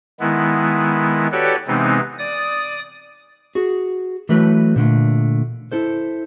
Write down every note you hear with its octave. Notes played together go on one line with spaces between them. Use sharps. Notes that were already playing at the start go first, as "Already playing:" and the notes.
D#3 G#3 B3 E4
F#4 G4 A4 B4 C#5 D5
C3 E3 G#3 B3 C4 D#4
D5 D#6
F#4 G#4
E3 F#3 A3 B4
A#2 D3 A3
E4 A4 C5